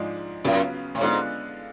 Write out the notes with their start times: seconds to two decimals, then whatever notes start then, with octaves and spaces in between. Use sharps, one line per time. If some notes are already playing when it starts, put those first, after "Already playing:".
Already playing: G#2 F3 G#3 D4
0.44 F#2 C#3 F#3 B3 F4
0.95 A2
1.01 G#2 D3 G#3 B3 D4 F4